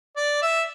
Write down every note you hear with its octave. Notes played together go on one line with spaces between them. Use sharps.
D5
E5